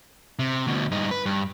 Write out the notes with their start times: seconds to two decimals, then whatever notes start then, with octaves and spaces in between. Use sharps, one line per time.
0.39 C3
0.67 D2 B2
0.92 G2 D#4
1.11 B4
1.26 G2